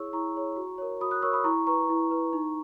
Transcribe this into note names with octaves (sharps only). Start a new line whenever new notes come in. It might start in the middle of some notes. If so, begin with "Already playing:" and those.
Already playing: E4 G#4 C#5 C#6 E6
E4 A#5 C#6
G#4 C#5
F#4
A#4 C#5
F#4 B5 D#6
D#6 F#6
A#4 C#5 C#6 E6
B5 D#6
E4 A#5 C#6
B4 A#5 C#6
E4
B4
D#4